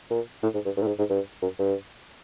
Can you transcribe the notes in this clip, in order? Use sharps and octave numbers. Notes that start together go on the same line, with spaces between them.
A#2
A2
G#2
G2
G2
A2
G#2
G#2
G2
F#2
G2